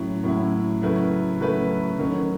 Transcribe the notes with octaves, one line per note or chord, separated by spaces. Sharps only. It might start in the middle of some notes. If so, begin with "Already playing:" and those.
Already playing: A2 F#3 C#4 E4
A2 F#3 C#4 E4
C#3 F#3 A3 E4 B4
C#3 F#3 A3 E4 B4
D#3 F#3 C#4